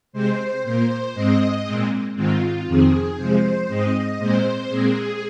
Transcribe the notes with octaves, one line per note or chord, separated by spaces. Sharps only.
C3 G#3 C4 C5
A#2 A#3 C5
G#2 G#3 C4 D#5
A#2 G#3 C4
G#2 D#3 G#3 C4 F4
F2 C3 D#3 C4 G#4
C3 F3 G#3 C5
G#2 G#3 C4 D#5
A#2 G#3 C4 C5
A#2 G#3 C4 G#4